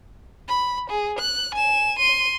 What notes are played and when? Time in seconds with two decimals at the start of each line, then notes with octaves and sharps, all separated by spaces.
0.48 B5
0.90 G#4
1.19 F#6
1.55 G#5 E7
1.99 C6 D#7